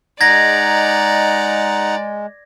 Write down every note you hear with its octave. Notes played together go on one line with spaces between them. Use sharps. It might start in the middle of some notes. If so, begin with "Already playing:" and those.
G#3 D#4 D5 F#5 A#5 G#6 A#6